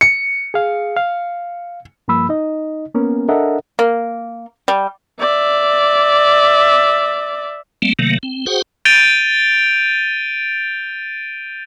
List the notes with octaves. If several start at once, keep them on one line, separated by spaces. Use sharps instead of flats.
C#7
G#4 F5
F5
G2 F3 A#3 B5 E6
D#4 D#5
A#3 B3 C#4 A#4
D4 A4 A#4 D#5 E5 F#5
A#3
G3
D5 E5
G3 A3 A#3 C4
C3 D#3 F#3 A3 A#3
C4
F#4 G#4 C5 F#5 G5
G6 A6 D7 D#7 F7 G7